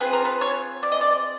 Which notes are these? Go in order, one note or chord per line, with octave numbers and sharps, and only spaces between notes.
C4 F4 G#4 B4
A#4
B4
C#5
D5
D#5
D5